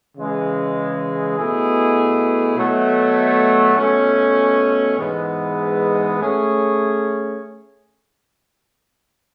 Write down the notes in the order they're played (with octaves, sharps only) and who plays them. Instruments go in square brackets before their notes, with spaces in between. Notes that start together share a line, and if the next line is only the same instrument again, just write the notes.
[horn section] C#3 E3 G#3
B2 A3 E4 G#4
B2 F#3 A3
B2 A3 C#4
G#2 E3 G#3 B3
A3 C#4 G#4 C#5